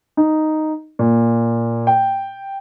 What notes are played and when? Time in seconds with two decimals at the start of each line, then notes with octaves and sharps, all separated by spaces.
0.17 D#4
0.99 A#2
1.87 G5